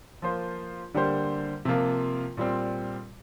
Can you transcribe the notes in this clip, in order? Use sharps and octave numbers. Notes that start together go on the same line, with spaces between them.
F3 A#3 F4 C5
D3 G3 A#3 G4 C5
C3 F3 A#3 F4
A#2 G3 C4